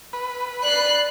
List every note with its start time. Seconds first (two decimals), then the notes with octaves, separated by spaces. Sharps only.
0.13 B4
0.64 D5 F#6 C7